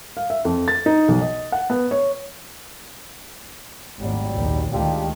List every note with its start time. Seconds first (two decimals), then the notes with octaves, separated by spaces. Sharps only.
0.17 F5
0.30 E5
0.45 F2
0.68 A6
0.86 D#4
1.08 B1
1.21 D#5
1.52 F#5
1.70 B3
1.91 C#5
4.00 G#1 D#2 A2 F#3 G3
4.35 A#1 D#2
4.72 D2 D#3 G#3 D4 F4 G4